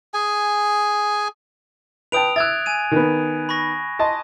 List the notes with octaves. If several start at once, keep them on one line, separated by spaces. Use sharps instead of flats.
G#4 G#5
B4 G5 A5 D#6 D7 F7
E5 E6 F#6 G#6 A6
G#5 G#6 D#7
D#3 B3
B5 C#6 A#6
D#5 A5 C6